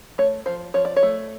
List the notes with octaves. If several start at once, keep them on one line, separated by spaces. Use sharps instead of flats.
A3 C#5
F3 C5
F3 C#5
D5
C#5
A3